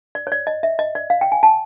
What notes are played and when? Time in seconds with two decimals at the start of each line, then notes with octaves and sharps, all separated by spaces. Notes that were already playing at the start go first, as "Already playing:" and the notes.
0.15 D5
0.27 C#5
0.32 D5
0.47 D#5
0.63 E5
0.79 D#5
0.95 D5
1.10 F5
1.21 G5
1.32 G#5
1.43 A5